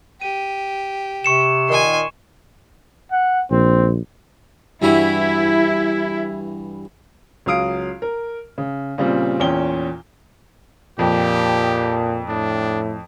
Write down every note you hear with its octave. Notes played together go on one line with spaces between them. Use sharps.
G4 D#7
C3 C#6 C#7 E7
A#2 D#3 G#5 C6
F#5
A#1 C4
G2 E3 E4 F#4
C#2 F#3 F5 D#6 D7
A#4
C#3
A#2 C#3 G3 C4
E2 A#2 C#4 G5 G7
F2 A#2 G4
A2 D4